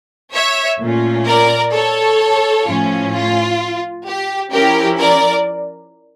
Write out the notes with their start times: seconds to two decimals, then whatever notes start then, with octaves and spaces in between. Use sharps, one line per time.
0.33 C#5 E5
0.79 A#2 A3 C#4 F4
1.26 A#4 D5
1.73 A4 C#5
2.67 A2 F3 C#4 F4
3.13 F4
4.06 G4
4.52 F3 C#4 E4 G4 A#4
4.99 A#4 D5